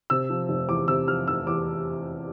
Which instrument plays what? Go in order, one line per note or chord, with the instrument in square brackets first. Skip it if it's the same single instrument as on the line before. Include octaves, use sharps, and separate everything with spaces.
[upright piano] C3 E6
F3
F1
E2 D6
C3 E6
F3 F6
F1 E6
E2 D6